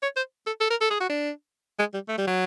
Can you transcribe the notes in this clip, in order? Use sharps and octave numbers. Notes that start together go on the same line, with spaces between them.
C#5
C5
A4
A4
A#4
A4
G#4
F#4
D4
G#3
G3
A3
G3
F#3